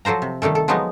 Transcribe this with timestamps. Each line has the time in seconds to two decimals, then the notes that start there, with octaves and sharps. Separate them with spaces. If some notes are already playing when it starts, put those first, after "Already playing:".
0.05 F3 F#3 A4 C5 A#5
0.22 C3
0.42 D#3 G3 A3 A4
0.55 A4
0.68 F3 F#3 G#3 B3 D#4